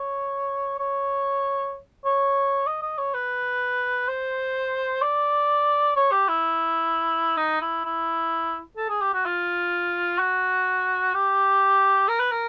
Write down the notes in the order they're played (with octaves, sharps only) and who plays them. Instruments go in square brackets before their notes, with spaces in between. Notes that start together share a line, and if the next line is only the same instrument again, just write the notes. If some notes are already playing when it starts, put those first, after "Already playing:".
Already playing: [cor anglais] C#5
C#5
C#5
D#5
D#5
C#5
B4
C5
D5
C#5
G4
E4
D#4
E4
E4
A4
G#4
G4
F#4
F4
F#4
G4
A#4
B4
A#4